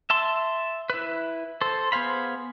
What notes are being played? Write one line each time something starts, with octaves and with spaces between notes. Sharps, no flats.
E5 A5 C6
E4 B4
A4 C5
B3 G#4 C5 F5 B5